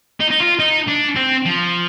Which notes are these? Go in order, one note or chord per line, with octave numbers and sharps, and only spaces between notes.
D#4
D#4
F4
D#4
D4
C4
F3